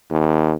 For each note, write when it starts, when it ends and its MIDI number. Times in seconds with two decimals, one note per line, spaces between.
0.11 0.53 39